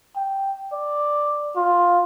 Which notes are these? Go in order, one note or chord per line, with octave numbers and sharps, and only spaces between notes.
G5
D5
F4